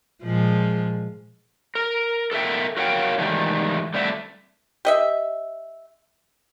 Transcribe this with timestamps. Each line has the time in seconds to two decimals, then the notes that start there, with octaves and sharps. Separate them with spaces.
0.22 A#2 F3 G#3
1.75 A#4
2.32 A4 A#4 E5 G5
2.77 F#4 A#4 C#5 F5 G5
3.18 G#2 D#3 E3 G3 A3
3.94 D3 G3 A3 C4 D5 E5
4.85 G4 D#5 E5